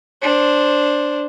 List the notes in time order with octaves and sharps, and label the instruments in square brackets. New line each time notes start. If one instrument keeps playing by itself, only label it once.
[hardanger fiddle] D4 C5